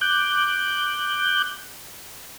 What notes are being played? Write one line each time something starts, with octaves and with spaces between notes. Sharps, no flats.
D6 F#6 G6